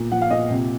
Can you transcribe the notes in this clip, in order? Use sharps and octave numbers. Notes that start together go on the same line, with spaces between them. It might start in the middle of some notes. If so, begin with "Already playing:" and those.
Already playing: A#2
F3 F#5
F5
A#2 D#5
C3